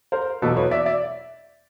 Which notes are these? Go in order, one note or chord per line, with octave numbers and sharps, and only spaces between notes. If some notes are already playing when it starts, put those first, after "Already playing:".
A#4 C5
E2 B2 F#3 A#3 A4 B4
B4 C#5
D5 E5
D5 E5